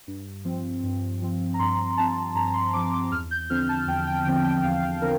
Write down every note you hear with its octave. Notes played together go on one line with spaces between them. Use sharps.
G2
F3 C4
G2
F3 C4
A#5
G2 C6
F3 C4 A5
G2 A#5
A#5
C6
F3 C4 D6
D6
E2 F6
G6
D3 F3 C4 F6
A5
E2 G5
G5
D3 F3 C4 G5
G5
E2 F5
F5
D3 F3 C4 A#4